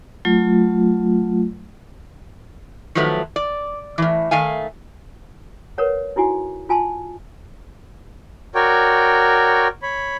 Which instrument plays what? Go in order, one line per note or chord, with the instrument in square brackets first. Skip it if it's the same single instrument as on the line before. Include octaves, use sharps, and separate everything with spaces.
[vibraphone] F#3 A3 F4
[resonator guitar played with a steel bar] D#3 F3 F#3 A3 B4
D5
A2 E3
D#3 A3 F5 G#5
[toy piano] A#4 B4 C#5 F#5
D#4 E4 F#4 G#5
F4 G#5 A5 C6
[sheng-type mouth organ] F#4 A#4 C#5 D5 G5
C#5 B5